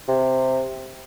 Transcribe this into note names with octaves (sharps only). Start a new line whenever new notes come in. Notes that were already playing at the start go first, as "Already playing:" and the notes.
C3